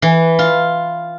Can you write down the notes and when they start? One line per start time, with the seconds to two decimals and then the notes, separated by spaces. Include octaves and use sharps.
0.02 E3
0.39 F4